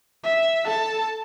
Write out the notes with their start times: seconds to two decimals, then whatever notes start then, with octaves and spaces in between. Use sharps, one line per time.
0.24 E5
0.65 A4 A5